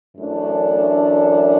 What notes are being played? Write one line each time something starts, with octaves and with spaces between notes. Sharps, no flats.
F#2 E3 A3 D4